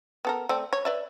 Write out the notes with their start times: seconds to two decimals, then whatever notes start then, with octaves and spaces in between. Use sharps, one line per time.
0.25 B3 A4 A#4
0.49 A3 C4 D5
0.73 C#5
0.85 B4 D5 E5